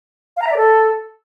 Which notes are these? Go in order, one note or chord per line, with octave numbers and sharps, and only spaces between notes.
F5
A#5
E5
D5
A4